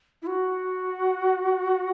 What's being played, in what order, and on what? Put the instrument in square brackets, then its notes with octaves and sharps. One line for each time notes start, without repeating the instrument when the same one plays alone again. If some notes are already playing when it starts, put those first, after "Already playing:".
[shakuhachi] E4
F#4